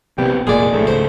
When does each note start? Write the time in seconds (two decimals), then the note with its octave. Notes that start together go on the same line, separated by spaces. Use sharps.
0.18 A#1 C3 B3 G4
0.47 F1 A#2 G#3 A#3 G#4 D5
0.73 A#1 A2 A3
0.87 C#2 G#2 C5